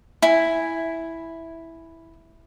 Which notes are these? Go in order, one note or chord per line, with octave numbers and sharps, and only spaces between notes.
E4 G#5